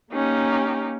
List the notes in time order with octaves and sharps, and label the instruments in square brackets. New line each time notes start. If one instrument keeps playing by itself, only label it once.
[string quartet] A#3 C#4 D#4 G4